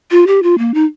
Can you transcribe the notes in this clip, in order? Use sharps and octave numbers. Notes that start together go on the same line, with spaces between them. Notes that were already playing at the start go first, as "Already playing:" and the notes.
F4
G4
F4
A#3
D#4